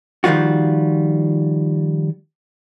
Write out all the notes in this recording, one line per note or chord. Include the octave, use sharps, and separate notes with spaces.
D#3 F3 G3 F4 F#4